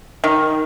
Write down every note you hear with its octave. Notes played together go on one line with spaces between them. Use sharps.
D#3